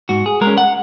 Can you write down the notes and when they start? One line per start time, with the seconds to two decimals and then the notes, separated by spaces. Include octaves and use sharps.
0.09 G#2 F#4
0.26 G#4
0.41 G#3 A#4
0.47 C#4
0.58 F#5